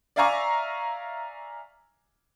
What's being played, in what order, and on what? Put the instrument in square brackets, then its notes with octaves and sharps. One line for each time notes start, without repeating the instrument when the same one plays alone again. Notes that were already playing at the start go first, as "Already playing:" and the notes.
[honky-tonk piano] D5 E5 F5 G#5 A#5 C#6